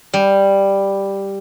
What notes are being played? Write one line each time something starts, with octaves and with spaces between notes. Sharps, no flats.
G3